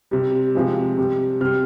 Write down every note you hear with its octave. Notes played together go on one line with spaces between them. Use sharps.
C3 G3
C3 F3 G#3
C3 G3
C3 G3 F6